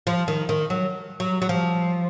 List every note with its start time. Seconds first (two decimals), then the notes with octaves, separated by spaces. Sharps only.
0.07 F3
0.28 D#3
0.49 D#3
0.70 F#3
1.20 F#3
1.42 F#3
1.49 F3